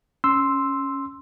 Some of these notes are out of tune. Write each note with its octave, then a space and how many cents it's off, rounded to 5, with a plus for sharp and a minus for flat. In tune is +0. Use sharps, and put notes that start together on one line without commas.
C#4 +0 C6 +0 E6 +0